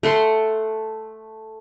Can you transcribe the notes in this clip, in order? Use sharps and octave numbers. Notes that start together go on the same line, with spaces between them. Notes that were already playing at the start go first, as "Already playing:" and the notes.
A3 F#5 C6